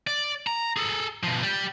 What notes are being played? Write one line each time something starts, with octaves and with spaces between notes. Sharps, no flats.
D5
A#5
G#4 A4
B2 F3
G3 G4